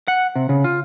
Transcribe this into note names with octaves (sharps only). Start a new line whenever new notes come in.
F#5
C3
C#3
F4